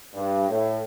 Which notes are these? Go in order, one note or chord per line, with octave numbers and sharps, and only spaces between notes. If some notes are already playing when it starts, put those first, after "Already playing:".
G2
A2